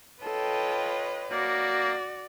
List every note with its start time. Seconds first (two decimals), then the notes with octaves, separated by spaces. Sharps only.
0.23 F4 A4 B4 C#5 D#5 G5
1.32 A#3 F#4 D5